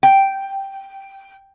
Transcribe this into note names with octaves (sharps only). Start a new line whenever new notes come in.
G5